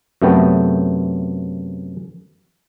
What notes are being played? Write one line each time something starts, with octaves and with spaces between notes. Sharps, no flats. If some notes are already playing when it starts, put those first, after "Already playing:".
F#2 C3 A3 B3 G5 A5